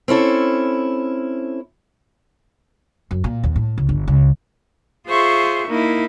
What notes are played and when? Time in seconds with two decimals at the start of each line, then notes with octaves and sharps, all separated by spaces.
0.08 C4 C#4 E4 A4
3.11 F#2
3.24 A#2
3.43 D#2
3.56 A2
3.78 C#2
3.89 G1
4.08 C#2
5.07 F4 G#4 C5 E5 C#6
5.67 A#3 D#4 E4